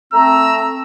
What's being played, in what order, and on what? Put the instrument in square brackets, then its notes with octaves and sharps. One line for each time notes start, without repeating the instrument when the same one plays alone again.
[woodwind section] A3 C4 A#5 [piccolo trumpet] E6